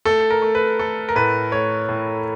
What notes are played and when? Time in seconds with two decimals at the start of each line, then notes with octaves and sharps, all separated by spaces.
0.05 A3 A4
0.30 A#4
0.42 A3
0.55 B4
0.79 A3 A4
1.09 A#4
1.16 A2 B4
1.52 A3 C#5
1.89 A2